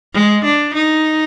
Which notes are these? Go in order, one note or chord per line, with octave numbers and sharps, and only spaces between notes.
G#3
D4
D#4